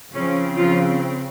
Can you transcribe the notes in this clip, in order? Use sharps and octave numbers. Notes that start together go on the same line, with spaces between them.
C#3 F3 C4 C#4
F3 F4